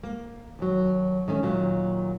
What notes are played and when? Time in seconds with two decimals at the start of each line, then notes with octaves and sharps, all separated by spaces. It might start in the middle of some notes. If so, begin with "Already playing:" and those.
0.03 A#3
0.59 D#2 F#3
1.28 D#3 A3 C#4
1.43 D#2 A#2 F#3 A#3